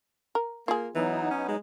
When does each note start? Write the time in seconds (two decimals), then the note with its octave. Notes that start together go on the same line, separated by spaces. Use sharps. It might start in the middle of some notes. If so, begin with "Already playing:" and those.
0.35 A#4
0.68 A#3 F4 G#4
0.95 E3 F#3 B3 D#4
1.31 C#4
1.49 G#3